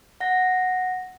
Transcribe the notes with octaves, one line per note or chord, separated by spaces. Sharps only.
F#5 A#6